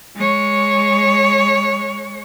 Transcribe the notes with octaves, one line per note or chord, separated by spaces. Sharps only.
G#3 C#5